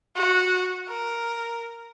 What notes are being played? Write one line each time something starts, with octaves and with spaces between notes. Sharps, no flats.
F#4
A#4